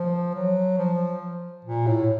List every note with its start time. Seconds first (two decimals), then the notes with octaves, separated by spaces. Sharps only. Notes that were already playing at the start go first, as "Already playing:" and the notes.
Already playing: F3
0.35 F#3
0.78 F3
1.65 A#2
1.87 A2